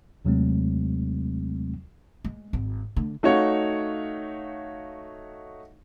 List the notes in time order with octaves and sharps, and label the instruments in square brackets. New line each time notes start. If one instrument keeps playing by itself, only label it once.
[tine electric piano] D#2 C3 F#3 G#3 A3 C4
[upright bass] G#3
G#1
D3 A3
[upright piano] A3 D#4 F#4 C#5 F5